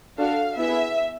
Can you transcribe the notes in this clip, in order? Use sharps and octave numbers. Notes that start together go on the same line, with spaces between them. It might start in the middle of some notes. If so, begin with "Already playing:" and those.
D4 F#4 A4 F5
B3 E4 G#4 E5